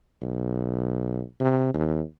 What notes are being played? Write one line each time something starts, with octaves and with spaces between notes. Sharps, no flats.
B1
C3
D#2